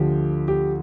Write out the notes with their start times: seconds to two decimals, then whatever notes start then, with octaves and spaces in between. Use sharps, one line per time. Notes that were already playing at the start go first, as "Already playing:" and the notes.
Already playing: D2 D3 F3 G4
0.48 G4